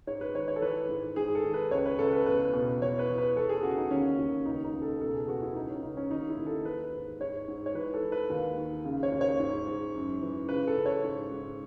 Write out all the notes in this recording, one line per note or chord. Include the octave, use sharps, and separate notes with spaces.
G#2 C#5
B4
D#3 C#5
C#5
A4
E3 B4
G#2
G#2 G#4
A4
D#3
B4
C#2 C#5
B4
C#2 A4
B4
E2 B4
B2
E3 C#5
B4
E3
B4
E2 A4
G#4
C#3 F#4
D#4
D#2 C#4
D#2
C#2 D#4
D#4
C#2
A4
B2 A4
G#4
E2 F#4
E4
C#2 D#4
C#4
C#2 D#4
C#4
D#2 D#4
E4
D#2
A4
E3 B4
G#2
G#2 C#5
G#2
C#5
E3 B4
A4
E3
B4
D#2
D#3
C#3
C#5
D#2
C#5
G#2
G#2
F#2
E3
C#3 B4
A4
C#3
C#5
G#2
G#2